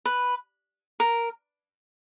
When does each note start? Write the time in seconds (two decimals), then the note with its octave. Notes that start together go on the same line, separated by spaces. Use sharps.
0.05 B4
1.00 A#4